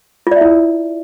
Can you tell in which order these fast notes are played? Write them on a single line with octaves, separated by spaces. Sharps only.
F4 D5 E5 E4